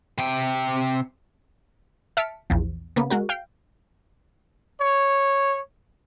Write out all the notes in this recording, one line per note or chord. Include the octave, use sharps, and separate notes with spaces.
C3 G5
E5 A5 F6 B6 C#7 D7
A#1 E2 F3
C#3 A#3 B3
G#3 F#4 A#4
F5 G5
C#5